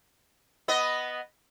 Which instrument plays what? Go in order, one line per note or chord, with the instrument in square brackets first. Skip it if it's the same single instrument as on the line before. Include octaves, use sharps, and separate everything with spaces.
[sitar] B3 D#5